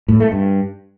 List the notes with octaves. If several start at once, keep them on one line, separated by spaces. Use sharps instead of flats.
A2
A3
G2